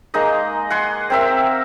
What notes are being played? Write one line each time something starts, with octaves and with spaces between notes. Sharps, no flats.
G#3 A#3 D#4 D#5
F#5 G#5 C6
C4 A#4 E5